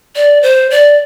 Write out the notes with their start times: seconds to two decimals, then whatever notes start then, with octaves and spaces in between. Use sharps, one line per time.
0.16 D5
0.43 C5
0.71 D5